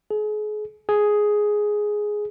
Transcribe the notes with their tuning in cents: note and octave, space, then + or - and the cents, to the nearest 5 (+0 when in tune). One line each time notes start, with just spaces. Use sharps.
G#4 +35
G#4 +5